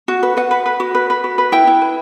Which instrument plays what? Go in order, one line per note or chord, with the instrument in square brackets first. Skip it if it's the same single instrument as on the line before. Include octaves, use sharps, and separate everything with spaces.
[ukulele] F#4
B4
B4 F#5
B4
B4
F#4
B4
B4
F#4
B4
E4 G5
E4
B4